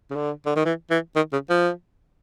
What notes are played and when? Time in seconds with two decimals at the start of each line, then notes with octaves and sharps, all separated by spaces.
0.10 C#3
0.15 D3
0.46 D3
0.56 D#3
0.65 E3
0.91 E3
1.16 D#3
1.33 C#3
1.49 F3